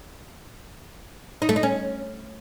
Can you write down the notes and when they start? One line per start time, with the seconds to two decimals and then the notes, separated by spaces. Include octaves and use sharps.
1.42 D#4
1.49 A3
1.56 D#4
1.63 C#4